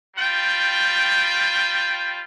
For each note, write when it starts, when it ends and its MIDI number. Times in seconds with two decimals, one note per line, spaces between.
0.17 2.21 55
0.17 2.21 65
0.17 2.21 79